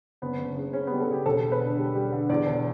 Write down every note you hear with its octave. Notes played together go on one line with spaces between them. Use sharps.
F#1 B3
F#1
C#3
C#3 C#4
G3 B3
A4
C#3 G4
E1 A4
E1
B4
D3
G3
G3
D3
E2 D5
E1